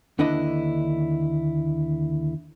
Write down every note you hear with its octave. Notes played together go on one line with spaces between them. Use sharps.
D#2 D3 D4 E4 B4 D#5